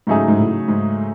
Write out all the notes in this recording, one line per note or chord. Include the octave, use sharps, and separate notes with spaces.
G#2 C#3 F#3 A3 D#4 G#4
G#2
A2
G#2